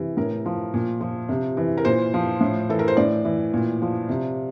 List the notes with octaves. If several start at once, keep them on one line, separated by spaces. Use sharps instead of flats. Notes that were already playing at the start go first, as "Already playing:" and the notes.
Already playing: C3 E3
A2 A#4
F3
A#2
F3
C3
E3
A#4
A#2 C5
F3
A2
E3 A4
A#4
C5
A2 D5
E3
A#2
F3
C3